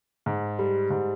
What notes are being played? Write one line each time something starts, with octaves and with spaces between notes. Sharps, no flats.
G#2
G3
G#2